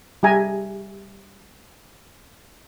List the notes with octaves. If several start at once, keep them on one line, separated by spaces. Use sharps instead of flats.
G3 G4 G#4 E5 G#5 A#5